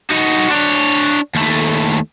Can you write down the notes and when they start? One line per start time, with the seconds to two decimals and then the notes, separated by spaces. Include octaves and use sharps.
0.10 D#4 F#4
0.50 D4 C#5
1.35 D#2 A3